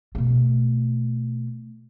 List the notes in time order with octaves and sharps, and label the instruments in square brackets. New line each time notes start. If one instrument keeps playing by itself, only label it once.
[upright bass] B2 A3